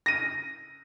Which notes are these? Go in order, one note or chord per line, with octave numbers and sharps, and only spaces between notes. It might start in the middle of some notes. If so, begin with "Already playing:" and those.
A#6 D#7